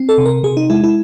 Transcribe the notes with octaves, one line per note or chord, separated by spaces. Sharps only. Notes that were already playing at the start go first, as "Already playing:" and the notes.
Already playing: C4
A4
C3
A#4
C3 G#4
D#4
G#3 E4
E4